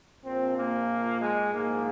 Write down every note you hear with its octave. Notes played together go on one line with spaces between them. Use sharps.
A#1 A#2 F3 C4
A#3
G#3
A#1 G#2 F3 A#3